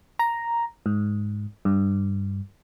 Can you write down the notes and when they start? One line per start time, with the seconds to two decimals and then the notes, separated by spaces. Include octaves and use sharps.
0.19 A#5
0.86 G#2
1.65 G2